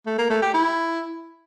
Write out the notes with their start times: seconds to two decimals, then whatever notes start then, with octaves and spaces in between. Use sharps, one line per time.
0.06 A3
0.18 A#3
0.30 A3
0.42 G4
0.54 E4